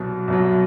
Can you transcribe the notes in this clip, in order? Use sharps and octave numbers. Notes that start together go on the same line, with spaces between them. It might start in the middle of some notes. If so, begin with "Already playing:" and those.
Already playing: C2 B2 F#3
C2 B2 F#3